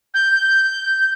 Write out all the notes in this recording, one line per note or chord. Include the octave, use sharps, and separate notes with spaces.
G6